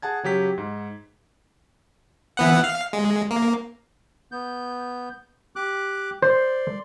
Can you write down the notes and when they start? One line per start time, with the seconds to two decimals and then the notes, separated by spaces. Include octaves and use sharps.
0.02 G#4 F#5 A5 G#6
0.23 C#3 F#3 G4 B6
0.58 G#2
2.37 E3 B3 F#5
2.64 F5
2.93 G#3
3.31 A#3
4.32 B3 G6
5.56 G4 D6 F#6
6.22 C5 D5 C6